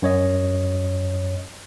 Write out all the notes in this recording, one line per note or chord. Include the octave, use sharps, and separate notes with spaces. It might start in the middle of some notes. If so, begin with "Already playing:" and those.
F#2 C#5 D#5